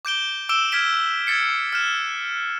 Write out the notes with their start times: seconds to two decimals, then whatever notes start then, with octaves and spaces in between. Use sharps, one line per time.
0.05 D6 G6 D7 G7
0.49 D6 E6 D7 E7 G7
0.72 F6 G#6 B6 D7
1.27 G#6 A6 C7 C#7
1.73 F6 F#6 E7